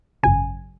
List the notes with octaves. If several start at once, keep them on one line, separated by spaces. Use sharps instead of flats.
G#1 F#2 C#3 G#5